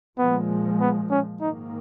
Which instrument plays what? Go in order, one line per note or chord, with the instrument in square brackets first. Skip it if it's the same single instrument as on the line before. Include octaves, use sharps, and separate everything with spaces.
[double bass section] A#2 F3 G#3 [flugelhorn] B3
[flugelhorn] B3
C#4
[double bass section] G#2 D#3 A#3 [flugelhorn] D#4